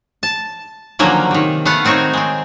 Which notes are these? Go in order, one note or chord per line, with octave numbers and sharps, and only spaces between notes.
A5
D3 D#3 F3 F#3 A#3 C#4
C3 D#3
A3 B3 F5 F#5
D#3 C4 D#4 F#4 C#5
G#3 C4